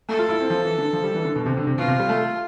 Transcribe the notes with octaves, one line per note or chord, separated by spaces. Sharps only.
A3 A4
F4
E4
C4
F3
E3
D3
F3
G3
E3
D3
B2
C3
D3
C3
B2 F4
C3
G3
A3